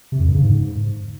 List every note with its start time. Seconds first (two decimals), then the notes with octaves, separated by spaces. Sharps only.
0.12 C3
0.19 F2
0.27 G2
0.34 C#3
0.42 G#2